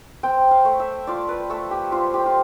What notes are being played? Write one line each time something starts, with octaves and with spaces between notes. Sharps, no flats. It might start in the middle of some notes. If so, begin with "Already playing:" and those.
C4 G5
F5
A3
E5
F4 D5
B4
A3 A4
G4
C4 F4
G4
F4